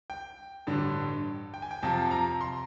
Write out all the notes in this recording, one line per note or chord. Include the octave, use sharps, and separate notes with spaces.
G5
A1 G2 D3
G5
G#5
G5
F2 C3 F3 A5
A#5
C6